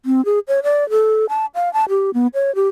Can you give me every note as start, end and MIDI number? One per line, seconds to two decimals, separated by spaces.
0.06 0.24 60
0.25 0.39 68
0.48 0.60 73
0.63 0.88 74
0.90 1.26 69
1.29 1.46 81
1.55 1.72 77
1.73 1.85 81
1.89 2.11 67
2.14 2.27 59
2.34 2.54 73
2.55 2.68 67